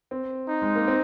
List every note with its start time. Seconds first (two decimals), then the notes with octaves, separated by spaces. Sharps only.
0.11 C4
0.49 D#4
0.62 G#3
0.75 A#3
0.87 C4